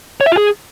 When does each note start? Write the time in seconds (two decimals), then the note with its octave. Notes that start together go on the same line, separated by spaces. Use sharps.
0.21 C#5
0.26 E5
0.32 F4
0.37 G#4